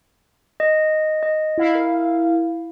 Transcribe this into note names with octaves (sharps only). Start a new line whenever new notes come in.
D#5
D#5
E4 F5
A#4